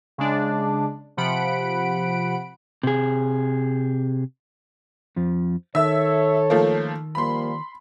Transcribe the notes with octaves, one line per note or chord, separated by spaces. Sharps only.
C#3 G#3 D4
C3 F3 F#5 B5 D7
C3 G#4
F2 F3
D#3 A4 C#5 E5 E6
F3 A3 A#3
F3 G3 A#3 B5 C6